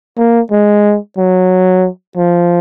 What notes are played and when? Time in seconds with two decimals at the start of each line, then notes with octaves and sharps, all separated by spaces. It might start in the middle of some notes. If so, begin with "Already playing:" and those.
0.17 A#3
0.51 G#3
1.18 F#3
2.17 F3